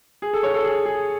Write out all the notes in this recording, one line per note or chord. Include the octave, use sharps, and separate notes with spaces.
G#4
A4
C#5
A4
G#4
G#4